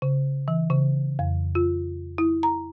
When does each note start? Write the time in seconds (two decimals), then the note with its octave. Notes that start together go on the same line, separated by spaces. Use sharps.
0.02 C#3
0.48 E3
0.70 C#3
1.19 F2
1.55 F4
2.18 E4
2.43 A#5